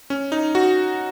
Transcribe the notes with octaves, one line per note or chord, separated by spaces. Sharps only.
C#4
D#4
F#4